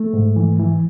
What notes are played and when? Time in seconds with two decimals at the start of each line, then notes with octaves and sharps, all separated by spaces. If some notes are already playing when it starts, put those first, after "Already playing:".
Already playing: A3
0.13 G#2
0.36 E3
0.59 E3